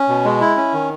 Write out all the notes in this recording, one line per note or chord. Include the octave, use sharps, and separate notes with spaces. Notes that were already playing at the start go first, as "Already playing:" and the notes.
Already playing: C#4
B2
G#3
E4
C#4
D#3